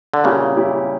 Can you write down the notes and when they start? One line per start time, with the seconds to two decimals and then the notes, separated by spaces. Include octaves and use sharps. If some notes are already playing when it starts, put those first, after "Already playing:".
0.14 D3
0.24 A#2 C#3 G3 C#4 E4 G4
0.57 G3 C#4 E4 G4